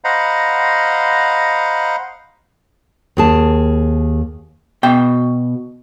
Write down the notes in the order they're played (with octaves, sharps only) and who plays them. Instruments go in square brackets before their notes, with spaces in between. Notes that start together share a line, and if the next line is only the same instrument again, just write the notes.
[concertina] C5 D#5 F5 F#5 A#5 B5
[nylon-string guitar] D#2 G#4 A5
[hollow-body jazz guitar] B2 G5